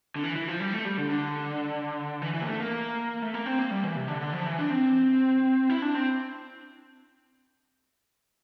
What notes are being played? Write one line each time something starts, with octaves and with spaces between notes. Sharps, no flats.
D3
E3
E3
F3
G3
A3
G3
D3
D3
E3
E3
A#3
A3
A#3
A3
A#3
C4
A#3
G3
E3
C3
D3
D3
F3
E3
D4
C4
E4
D4
C4